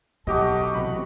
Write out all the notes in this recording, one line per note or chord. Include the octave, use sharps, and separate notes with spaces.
B1 F#3 F#4 G4 A4 D#5 D6
A1 C3 B5